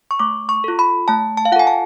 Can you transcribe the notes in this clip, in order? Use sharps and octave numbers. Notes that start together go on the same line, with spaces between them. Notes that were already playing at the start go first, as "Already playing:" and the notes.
C#6
A3 D6
C#6
F4 A4
B5
A3 A5
A5
F5
F4 A4 F#5 G#5
A5